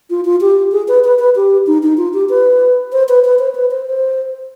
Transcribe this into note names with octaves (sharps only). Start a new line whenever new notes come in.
F4
F4
G4
G#4
B4
B4
B4
G4
D#4
D#4
F4
G4
B4
C5
B4
B4
C5
B4
C5
C5